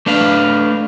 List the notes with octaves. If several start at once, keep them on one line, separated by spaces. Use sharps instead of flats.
A3 D4 B4 F5